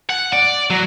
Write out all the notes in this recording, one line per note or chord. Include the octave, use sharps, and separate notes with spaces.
F#5
D5
F#3